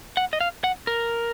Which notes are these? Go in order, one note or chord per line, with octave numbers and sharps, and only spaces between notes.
F#5
D#5
F5
F#5
A#4